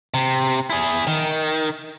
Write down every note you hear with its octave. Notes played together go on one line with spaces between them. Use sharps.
C3
E4 G#4
D#3